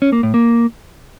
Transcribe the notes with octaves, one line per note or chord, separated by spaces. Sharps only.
C#4
A#3
A2
A#3